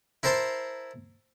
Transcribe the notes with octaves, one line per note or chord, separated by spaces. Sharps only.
E4 A#4 C5 A5 A#5 C6